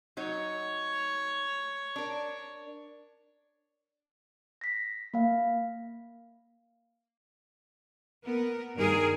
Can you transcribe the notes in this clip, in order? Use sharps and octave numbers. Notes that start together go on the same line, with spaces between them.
F#3 D#4 C#5
D4 A#4
A#6 B6
A#3 F5
B3 A#4
G2 D#3 G#4 A#4